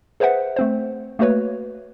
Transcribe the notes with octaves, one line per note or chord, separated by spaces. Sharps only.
G#4 B4 C5 E5 F#5
A3 C4 C5
A3 A#3 F#4 B4 C#5